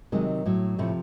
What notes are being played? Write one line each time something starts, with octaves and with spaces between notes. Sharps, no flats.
C3 D#3 F#3 G#3
A2 F#3
A2 C3 F3 A3